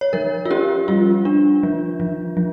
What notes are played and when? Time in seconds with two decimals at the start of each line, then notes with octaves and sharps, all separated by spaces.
0.01 C#5
0.13 F3 A#4
0.45 F4
0.51 C#4 G4
0.88 G3 F4
1.25 D4
1.63 F3
2.00 F3
2.37 F3